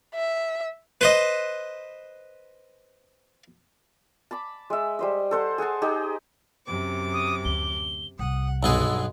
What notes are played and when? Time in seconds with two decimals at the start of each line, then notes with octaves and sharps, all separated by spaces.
0.15 E5
1.01 B4 C5 D#5
4.31 A5 B5 D6
4.70 G#3 E5
4.99 G3 C5 D#5
5.31 A4 C5 F#5
5.58 G#4 F#5 G#5 A5
5.82 D#4 G4 G#4
6.66 F#2 C3 D6
7.13 D#6
7.45 D2 G7
8.19 C2 C3 F#5 D#6
8.63 B1 G2 G#3 B3 G#4 E6